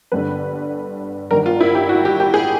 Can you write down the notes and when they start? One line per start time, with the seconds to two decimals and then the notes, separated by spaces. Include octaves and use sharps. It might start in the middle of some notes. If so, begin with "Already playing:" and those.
0.12 G1 G2 D3 B4
1.31 G1 G2 D#3 A#4
1.46 F4
1.61 E4
1.75 G4
1.89 F#4
2.05 G4
2.20 G4
2.34 G#4